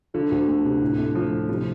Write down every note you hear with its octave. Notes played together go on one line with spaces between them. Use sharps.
D3 F3
D2
A3
C3
A2
A3
F3 F4
A2
C3 F3